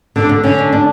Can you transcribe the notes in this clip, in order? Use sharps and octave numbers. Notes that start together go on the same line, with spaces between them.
D3 D4
D3
D3 C#4
D4
D4